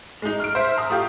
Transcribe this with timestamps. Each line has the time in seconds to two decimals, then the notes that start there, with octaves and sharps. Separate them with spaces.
0.22 G#3 D#4
0.40 F6 D7
0.55 C5 E5
0.77 A#5 D#6
0.90 A3 F4 G4